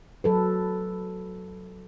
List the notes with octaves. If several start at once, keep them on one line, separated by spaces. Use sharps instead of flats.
F#3 A4 B4